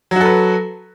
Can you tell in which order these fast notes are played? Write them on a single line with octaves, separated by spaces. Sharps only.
F#3 F#4 A4 B4